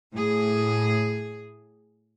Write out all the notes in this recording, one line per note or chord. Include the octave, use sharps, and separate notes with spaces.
A2 G#4